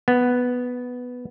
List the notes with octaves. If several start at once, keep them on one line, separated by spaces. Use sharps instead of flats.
B3